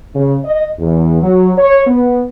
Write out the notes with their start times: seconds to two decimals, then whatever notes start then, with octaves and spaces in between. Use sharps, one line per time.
0.15 C#3
0.45 D#5
0.79 E2
1.22 F#3
1.58 C#5
1.87 B3